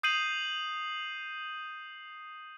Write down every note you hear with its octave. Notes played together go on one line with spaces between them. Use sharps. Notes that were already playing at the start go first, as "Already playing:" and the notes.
D#6 G6 C7 D#7 F#7